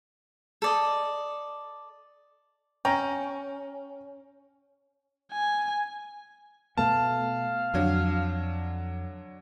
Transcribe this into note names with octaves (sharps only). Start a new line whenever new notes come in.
A4 D5 D#5
C#4 G5 A#5
G#5
B2 A3 B3 F5 A5
F2 D3 F#3